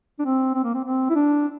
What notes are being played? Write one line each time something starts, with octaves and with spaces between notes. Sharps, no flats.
D4
C4
C4
A#3
C4
C4
E4
D4